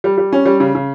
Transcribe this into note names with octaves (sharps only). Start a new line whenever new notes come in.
G3
G3
C#4
G3
C#3
C#3